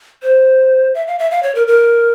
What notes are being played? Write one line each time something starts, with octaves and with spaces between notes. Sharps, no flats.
C5
E5
F5
E5
F5
C#5
A#4
A#4